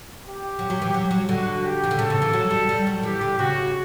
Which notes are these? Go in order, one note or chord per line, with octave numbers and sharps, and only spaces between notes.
G4
F#3
F#3
E3
F#3
F#3
D3 F#4
G4
E3
D3
C#3 A4
C#3
E3
F#3
G3
G3
F#3
E3 G4
D3
C#3 F#4